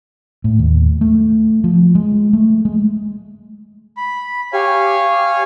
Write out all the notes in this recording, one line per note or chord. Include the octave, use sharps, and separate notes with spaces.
A2
D#2
A3
F3
G#3
A3
G#3
B5
G4 C#5 F5 G#5